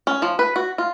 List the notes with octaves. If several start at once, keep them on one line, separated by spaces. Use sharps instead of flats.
C#4
F3
B4
F#4
F4